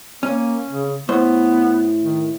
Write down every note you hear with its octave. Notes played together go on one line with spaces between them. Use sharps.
A#3 C#4
C#3
A2 B3 C5
D#3